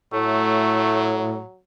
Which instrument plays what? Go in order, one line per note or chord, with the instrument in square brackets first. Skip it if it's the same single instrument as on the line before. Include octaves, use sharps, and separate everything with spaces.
[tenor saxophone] A2 [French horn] F#3 [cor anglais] A3